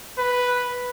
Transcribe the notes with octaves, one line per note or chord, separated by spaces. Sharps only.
B4